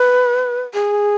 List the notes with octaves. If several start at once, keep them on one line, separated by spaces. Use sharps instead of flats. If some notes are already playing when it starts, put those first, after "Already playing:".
Already playing: B4
G#4